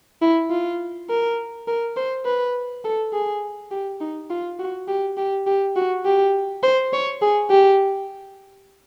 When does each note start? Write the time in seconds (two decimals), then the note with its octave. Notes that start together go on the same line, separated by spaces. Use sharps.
0.22 E4
0.50 F4
1.09 A#4
1.68 A#4
1.96 C5
2.26 B4
2.84 A4
3.12 G#4
3.71 G4
4.01 D#4
4.30 F4
4.59 F#4
4.88 G4
5.17 G4
5.47 G4
5.76 F#4
6.05 G4
6.63 C5
6.93 C#5
7.21 G#4
7.50 G4